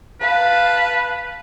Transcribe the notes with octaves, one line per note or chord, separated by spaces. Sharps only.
B4 F5 A5